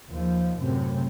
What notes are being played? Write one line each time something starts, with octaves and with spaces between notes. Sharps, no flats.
D#2 F3
F#2 A2 C3